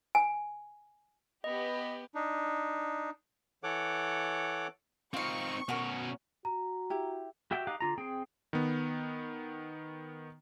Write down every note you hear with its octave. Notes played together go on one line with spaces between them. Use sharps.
G#5
B3 G4 D#5
D4 D#4
E3 A4 C#5 F#5 D6
C4 D#4 F4 F5 C#6
B2 C#4 F#4 A#4
F#4 A#5
E4 G4
F#4 G4 E5 G5
D#4 G4 F5 F#6
D3 F4 A#5
C4 G#4 G5
D#3 B3